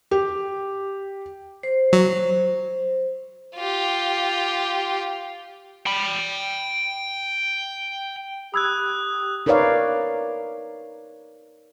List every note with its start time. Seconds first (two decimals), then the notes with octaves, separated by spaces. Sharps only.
0.11 G4
1.63 C5
1.93 F#3
3.55 F4 G4
5.86 G5 B5
8.54 G4 B5 D#6 E6 F#6 G#6
9.46 D#4 A#4 B4 C#5 D5 F5